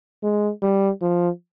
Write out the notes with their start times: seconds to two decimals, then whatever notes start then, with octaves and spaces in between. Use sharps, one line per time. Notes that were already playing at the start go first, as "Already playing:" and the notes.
0.23 G#3
0.62 G3
1.02 F3